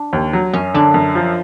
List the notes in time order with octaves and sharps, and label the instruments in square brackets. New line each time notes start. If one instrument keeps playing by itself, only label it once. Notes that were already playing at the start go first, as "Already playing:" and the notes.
Already playing: [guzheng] D4
[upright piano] D#2
F#3
[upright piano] F#2 [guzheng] C#4
[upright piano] D3 [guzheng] D4
[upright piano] F#2
F3